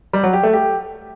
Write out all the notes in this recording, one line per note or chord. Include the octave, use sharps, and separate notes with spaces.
G3
F#3
G4
A3
G4